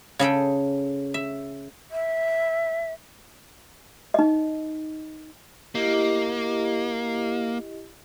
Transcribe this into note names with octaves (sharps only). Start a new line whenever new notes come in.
C#3 G#4 A4 G5
E5
E5
D#4 D#5
A#3 E4 G4 D#5